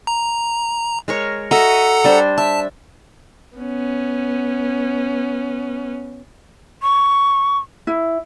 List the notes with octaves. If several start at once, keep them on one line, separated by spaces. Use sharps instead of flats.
A#5
G#3 A#4 C#5
F#4 A4 D#5 E5 F#5 A#5
G3 D4 C5
E5 A5
B3 C#4
C#6
E4